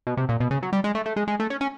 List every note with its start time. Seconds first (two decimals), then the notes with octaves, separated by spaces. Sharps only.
0.07 B2
0.17 C3
0.29 A#2
0.40 B2
0.51 C#3
0.63 F#3
0.73 G3
0.84 G#3
0.95 A3
1.06 A3
1.16 G#3
1.28 G#3
1.40 A3
1.50 C#4
1.61 C#4